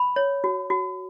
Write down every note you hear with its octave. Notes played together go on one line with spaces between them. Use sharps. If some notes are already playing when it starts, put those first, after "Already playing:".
Already playing: B5
C#5
F#4
F#4